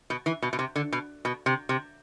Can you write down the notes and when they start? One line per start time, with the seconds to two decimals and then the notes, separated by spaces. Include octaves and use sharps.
0.10 B2
0.26 E3
0.42 B2
0.53 B2
0.59 C3
0.76 D3
0.92 B2
1.25 B2
1.46 C3
1.69 C3